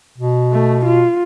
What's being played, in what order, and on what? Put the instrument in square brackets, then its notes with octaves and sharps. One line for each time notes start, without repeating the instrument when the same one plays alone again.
[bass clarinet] B2
[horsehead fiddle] A3
F4